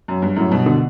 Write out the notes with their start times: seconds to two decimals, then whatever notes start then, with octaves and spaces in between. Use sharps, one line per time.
0.08 F#2
0.22 G2
0.36 F#2 A2
0.51 G2 B2
0.66 B2 D3